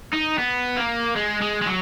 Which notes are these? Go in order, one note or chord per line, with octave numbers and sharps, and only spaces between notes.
D#4
B3
A#3
G#3
G#3
G#3
F#3